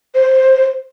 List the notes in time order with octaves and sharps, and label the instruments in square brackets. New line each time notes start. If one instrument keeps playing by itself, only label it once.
[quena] C5